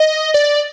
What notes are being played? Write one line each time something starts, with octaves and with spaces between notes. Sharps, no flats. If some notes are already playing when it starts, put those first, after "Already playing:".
Already playing: D#5
D5